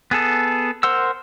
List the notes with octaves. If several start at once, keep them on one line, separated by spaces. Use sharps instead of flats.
B3 G#4 A4
A#4 C5 F#5 E6